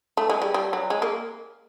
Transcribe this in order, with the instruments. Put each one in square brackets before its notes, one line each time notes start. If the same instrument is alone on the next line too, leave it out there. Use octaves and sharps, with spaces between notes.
[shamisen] A3
G#3
G3
G3
F#3
G#3
A#3